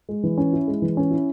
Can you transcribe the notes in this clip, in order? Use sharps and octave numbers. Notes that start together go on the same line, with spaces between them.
G#3
E3
C#4
E4
G#3
E3
C#4
E4